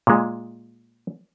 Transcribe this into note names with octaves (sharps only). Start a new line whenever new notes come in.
A#2 G#3